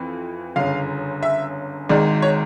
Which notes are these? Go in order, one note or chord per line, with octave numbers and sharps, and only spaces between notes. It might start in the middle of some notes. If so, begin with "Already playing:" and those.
Already playing: F2 E3
G1 F#2 C#3 F5
E5
G#1 G#2 D#3 D5
C#5